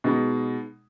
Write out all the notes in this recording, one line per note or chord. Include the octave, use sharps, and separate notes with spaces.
B2 G#3 B3 D#4